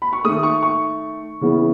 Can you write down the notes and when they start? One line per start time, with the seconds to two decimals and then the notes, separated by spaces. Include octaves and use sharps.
0.02 B5
0.13 C#6
0.24 D#3 A3 D#6
0.43 C#6
0.63 C#6
1.41 C#3 E3 B3